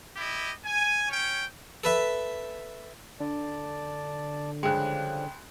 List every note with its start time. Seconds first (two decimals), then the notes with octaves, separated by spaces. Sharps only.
0.16 E4 G4 D#5
0.65 G#5
1.09 C#4 C#5 G5
1.84 A4 B4 E5
3.20 D3 D5 A5
4.63 C#2 C#3 F3 G3 G#3 G5 F#6